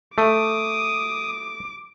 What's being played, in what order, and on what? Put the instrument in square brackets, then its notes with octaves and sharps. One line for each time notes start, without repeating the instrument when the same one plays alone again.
[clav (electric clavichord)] A3 [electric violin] D6 [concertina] D#6